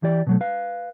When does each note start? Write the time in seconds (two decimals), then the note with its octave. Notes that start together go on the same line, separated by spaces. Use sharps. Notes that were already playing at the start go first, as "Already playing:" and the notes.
0.03 E3 G4 D5
0.27 B2 F#3 A3
0.41 B4 F5